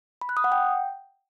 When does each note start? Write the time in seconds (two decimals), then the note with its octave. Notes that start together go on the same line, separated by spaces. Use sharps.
0.21 B5
0.29 F#6
0.37 D#6
0.44 F#5
0.52 G5